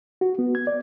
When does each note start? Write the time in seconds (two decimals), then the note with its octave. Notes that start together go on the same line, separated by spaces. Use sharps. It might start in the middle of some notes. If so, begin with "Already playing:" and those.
0.21 F#4
0.39 B3
0.55 G#6
0.67 D5